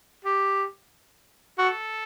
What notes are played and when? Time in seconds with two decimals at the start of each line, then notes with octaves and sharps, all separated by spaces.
0.25 G4
1.58 F#4 A4